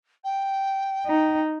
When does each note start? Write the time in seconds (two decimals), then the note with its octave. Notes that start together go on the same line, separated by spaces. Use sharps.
0.24 G5
1.06 D#4